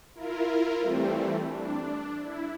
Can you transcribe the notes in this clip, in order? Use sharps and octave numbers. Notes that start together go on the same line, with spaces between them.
E4 F4 A#4
E3 G3 A3 C4
D4
E4